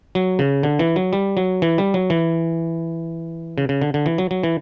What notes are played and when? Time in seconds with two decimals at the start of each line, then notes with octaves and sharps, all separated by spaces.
0.15 F#3
0.39 C#3
0.63 D3
0.79 E3
0.96 F#3
1.13 G3
1.37 F#3
1.62 E3
1.78 G3
1.94 F#3
2.10 E3
3.58 C#3
3.69 C#3
3.82 D3
3.94 D3
4.06 E3
4.18 F#3
4.31 F#3
4.44 E3